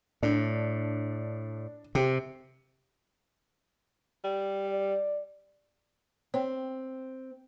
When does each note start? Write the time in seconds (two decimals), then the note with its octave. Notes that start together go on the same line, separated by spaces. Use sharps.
0.23 A2 D4
1.95 C3 G4
4.24 G3
4.69 D5
6.34 C4 C#5 G5